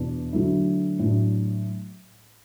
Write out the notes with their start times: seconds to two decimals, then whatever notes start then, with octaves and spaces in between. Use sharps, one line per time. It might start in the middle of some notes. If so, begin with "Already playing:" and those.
Already playing: E2 B2 B3 D4
0.33 D3 F#3 A3 E4
0.99 A2 F#3 D4